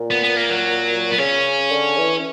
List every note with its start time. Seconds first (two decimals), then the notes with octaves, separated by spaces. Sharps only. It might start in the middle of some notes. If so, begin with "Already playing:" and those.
Already playing: A#2
0.11 B3
0.24 B3
0.37 A#3
0.50 F#3
1.11 B3
1.18 C#3 C#4
1.71 D3
1.98 E3